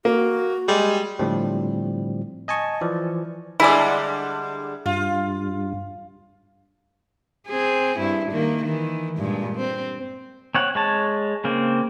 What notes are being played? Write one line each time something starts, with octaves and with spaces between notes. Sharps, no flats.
A#3 F#4
G3 G#3
A2 D3 F3 G3 C4
D#5 G#5 A5 C#6
E3 F3 D5
D3 G3 G#3 E4 G#4 D5
G2 F4
C4 G#4
G2 E4
D#3 A#3
D#3 E3
G2 A#2 G#3
C4
C4 C#5 F#5
G#3 C#5 A5
C#3 A#3 C4